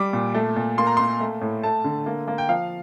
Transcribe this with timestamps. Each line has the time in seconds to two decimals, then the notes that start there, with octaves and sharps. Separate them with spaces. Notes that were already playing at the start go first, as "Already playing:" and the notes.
Already playing: G3 D6
0.13 A#2
0.34 A3
0.56 A#2
0.78 A#3 C6
0.87 A#5
0.97 A#3 C6
1.20 A3
1.41 A2
1.63 A3 A5
1.84 D3
2.06 A#3
2.28 A#3
2.38 G5
2.48 F3 F5